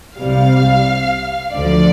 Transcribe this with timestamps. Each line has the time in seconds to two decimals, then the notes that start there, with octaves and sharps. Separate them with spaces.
0.17 C2 C3 G3 F5
1.54 D2 D3 F3 D5